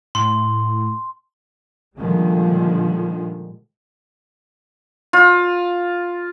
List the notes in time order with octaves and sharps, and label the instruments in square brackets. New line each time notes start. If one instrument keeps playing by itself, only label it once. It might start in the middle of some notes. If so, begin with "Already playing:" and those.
[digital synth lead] A2 [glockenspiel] C6
[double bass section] A#2 D3 D#3 F3 G3 G#3
[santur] F4